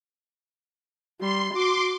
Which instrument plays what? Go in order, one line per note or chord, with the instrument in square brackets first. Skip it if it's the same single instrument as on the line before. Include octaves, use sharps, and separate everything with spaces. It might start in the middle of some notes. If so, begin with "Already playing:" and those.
[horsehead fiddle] G3 [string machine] C6
[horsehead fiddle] F#4 [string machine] C6 D6